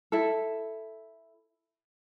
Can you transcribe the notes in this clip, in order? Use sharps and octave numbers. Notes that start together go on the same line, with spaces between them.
E4 A4